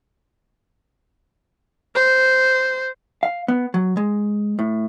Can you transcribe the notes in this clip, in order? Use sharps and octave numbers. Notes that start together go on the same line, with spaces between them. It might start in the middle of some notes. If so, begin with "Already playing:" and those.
C5
F5
B3
F#3
G#3
A2